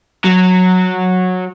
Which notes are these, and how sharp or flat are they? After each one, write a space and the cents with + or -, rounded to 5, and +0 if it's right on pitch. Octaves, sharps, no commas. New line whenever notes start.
F#3 -10